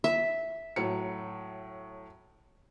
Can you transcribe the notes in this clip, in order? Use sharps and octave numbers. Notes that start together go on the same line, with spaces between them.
E5
A2 F#3 C#7